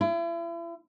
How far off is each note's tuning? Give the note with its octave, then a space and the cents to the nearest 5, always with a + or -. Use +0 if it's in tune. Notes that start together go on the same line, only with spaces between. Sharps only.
E4 +40